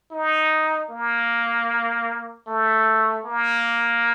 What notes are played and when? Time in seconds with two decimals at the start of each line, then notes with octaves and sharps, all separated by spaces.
0.11 D#4
0.90 A#3
2.47 A3
3.25 A#3